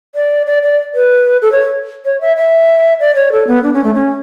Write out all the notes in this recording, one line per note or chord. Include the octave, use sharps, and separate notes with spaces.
D5
D5
D5
B4
A4
C#5
C#5
E5
E5
D5
C#5
A4
B3
D4
C#4
A3
C#4